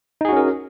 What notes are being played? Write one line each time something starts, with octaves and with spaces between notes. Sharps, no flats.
C#4 D#4 F#4 G#4 A#4